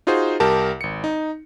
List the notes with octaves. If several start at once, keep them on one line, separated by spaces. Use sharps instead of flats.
D#4 F4 F#4 G#4 C5
C2 G4 A#4 A5
G#1 C#7
D#4